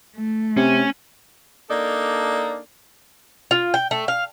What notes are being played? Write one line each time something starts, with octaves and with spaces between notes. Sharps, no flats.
A3
C3 C#4
A#3 D4 D#4 A4 D5
F4
G5
A3
F5